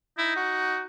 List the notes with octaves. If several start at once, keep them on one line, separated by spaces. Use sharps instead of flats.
D#4 E4
F#4